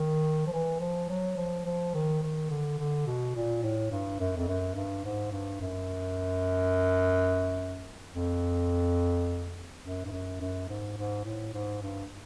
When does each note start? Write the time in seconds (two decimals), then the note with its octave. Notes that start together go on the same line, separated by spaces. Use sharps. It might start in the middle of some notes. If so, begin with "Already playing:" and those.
Already playing: D#3
0.47 F3
0.53 E3
0.80 F3
1.09 F#3
1.37 F3
1.66 F3
1.94 D#3
2.23 D#3
2.50 D3
2.79 D3
3.07 B2
3.35 A#2
3.63 A2
3.91 G2
4.20 F#2
4.37 F2
4.48 F#2
4.76 G2
5.05 G#2
5.32 G2
5.61 F#2
8.15 F2
9.84 F#2
10.05 G2
10.12 F#2
10.41 F#2
10.69 G#2
10.97 G#2
11.25 A2
11.54 G#2
11.82 G2